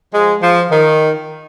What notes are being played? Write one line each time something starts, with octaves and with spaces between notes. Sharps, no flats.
F3 G#3
F3
D#3